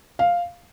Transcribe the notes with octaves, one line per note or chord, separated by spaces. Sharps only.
F5